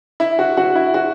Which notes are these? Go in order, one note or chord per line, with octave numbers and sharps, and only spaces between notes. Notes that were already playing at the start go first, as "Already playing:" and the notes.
E4
F#4
F#4
E4
F#4